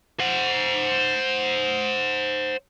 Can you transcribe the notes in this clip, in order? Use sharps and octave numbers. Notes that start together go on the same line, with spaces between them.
C5 F#5